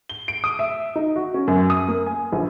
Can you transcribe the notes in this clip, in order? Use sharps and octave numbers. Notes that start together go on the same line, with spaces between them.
G7
D7
D#6
E5
D#4
F#4
C#4
F#2
D#6
A#3
G#5
A#1